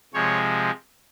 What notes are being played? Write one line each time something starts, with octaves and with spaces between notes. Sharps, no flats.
C3 F3 G#3 C#5